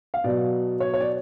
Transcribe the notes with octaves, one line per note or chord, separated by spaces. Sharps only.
F5
B2 F#3 D5
C#5
C#5
D5